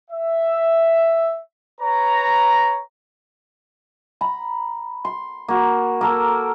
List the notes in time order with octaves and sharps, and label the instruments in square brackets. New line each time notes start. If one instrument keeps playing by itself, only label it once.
[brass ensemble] E5
B4 C#5 A#5
[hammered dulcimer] A#5 B5
C6
A#3 F#4
A#3 A4 A#4